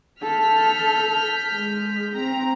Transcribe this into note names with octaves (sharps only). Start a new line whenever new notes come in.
A4 F6 G6 B6
G#3
C4 A#5